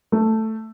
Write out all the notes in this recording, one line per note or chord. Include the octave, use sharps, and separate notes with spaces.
A3